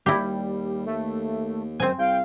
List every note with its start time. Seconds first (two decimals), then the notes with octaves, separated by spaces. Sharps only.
0.06 D#2 G3 E4 G4
0.86 A3
1.80 F#2 C4 C5 G#5
1.99 C2 F5 G5